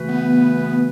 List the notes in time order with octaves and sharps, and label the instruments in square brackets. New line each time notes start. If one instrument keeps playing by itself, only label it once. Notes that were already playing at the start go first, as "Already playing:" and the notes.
Already playing: [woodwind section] C#3 E3 A3 F#4 B4
[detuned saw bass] B3